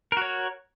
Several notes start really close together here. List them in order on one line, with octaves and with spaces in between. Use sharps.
A#4 F#4 C#5